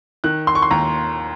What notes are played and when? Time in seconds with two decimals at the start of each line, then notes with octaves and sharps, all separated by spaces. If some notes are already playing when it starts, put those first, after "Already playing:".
0.24 D#3 F#6
0.47 C6
0.55 C#6
0.62 C6
0.71 D#2 A#5